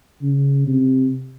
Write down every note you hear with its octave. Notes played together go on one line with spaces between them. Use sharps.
C#3
C3